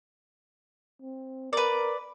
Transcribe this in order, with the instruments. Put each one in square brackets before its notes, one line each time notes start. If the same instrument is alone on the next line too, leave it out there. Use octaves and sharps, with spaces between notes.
[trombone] C4
[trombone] A#4 [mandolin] B4 D5